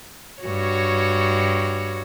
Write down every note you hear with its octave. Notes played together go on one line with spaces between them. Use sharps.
G2 F#4 C#5